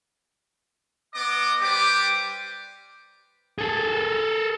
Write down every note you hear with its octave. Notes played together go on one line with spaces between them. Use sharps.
B3 D#5 D6
G3 G4 B4 C5 D6
G#4 A4